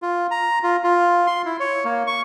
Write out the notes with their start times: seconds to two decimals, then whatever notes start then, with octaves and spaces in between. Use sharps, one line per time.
0.02 F4
0.31 A#5
0.63 F4
0.84 F4
1.27 C6
1.45 E4
1.60 C#5
1.85 A#3
2.07 C#6